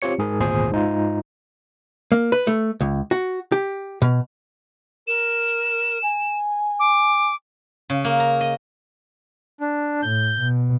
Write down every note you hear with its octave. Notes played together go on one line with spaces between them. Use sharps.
C4 F4 G4 C#5 C#7
G#2 G#4 A#4
G#1 D2 A#2 G#4 C5
G#2 D#4 F4
A#3
B4
A3
C#2
F#4
G4
B2
A#4 E7
G#5
D6
C#3
A#3
A#5
D#5
D4
A2 G6
B2